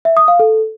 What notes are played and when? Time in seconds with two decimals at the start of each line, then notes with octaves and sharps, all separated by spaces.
0.05 E5
0.17 D#6
0.28 F5
0.40 A4